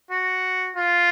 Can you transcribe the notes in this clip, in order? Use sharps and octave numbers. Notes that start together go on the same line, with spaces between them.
F#4
F4